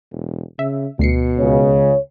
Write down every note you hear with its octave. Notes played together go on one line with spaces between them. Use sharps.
E1
C#3 E5
D2 B2 C7 C#7
C#2 C#3 C#5